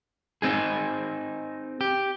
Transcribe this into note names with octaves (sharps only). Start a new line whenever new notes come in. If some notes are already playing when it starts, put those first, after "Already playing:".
C4 D#4 G#4
G4